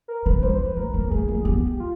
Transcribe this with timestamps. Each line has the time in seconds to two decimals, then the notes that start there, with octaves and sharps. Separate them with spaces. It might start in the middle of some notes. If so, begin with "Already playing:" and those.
0.08 A#4
0.25 C#3 B4
0.43 G3 C5
0.59 G#3 B4
0.76 A3 A#4
0.94 A#3
1.11 A3 G#4
1.28 A3
1.44 B3 G4
1.80 F4